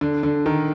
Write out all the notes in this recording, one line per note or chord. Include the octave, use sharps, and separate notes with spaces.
D3
D3
D#3